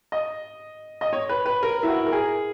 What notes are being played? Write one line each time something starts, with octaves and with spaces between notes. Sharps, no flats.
D#5
D#5
C#5
B4
B4
A#4
E4
F#4
A#4
G#4